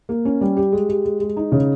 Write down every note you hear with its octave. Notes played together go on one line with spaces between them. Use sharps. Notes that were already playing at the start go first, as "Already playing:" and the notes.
A#3
C#4
G3
G4
G#3
G4
G#3
G#3
D#4
C#3